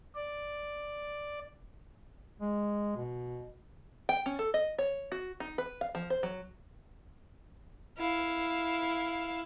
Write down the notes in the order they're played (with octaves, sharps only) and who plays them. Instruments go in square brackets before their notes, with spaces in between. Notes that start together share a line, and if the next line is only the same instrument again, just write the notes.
[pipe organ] D5
[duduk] G#3
B2
[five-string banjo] G5
C#4
A4
D#5
C#5
F#4
D#4
B4
F5
F3
C5
F#3
[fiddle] E4 F5